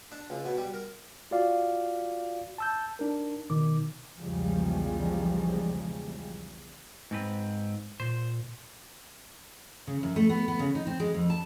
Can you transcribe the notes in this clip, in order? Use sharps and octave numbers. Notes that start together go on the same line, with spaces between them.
D4
C#2
B2
G3
A#4
F4 F#4 D5 F5
A5 E6 G6
D4 D#4 A#4
B2 D#3 D6
B1 E2 C#3 F3 G3 G#3
G#2 C4 B4
A#2 C5
C#3
F#2
A3
B3
B3
C#3
D#4
C4
G#3
F2
A5